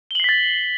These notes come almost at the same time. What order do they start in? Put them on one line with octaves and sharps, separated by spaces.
G7 F#7 C7 B6 A6